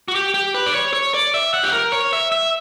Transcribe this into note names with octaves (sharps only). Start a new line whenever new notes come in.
F#4
G4
G4
B4
D5
C#5
C#5
D5
E5
F#5
G4
A#4
C#5
E5
E5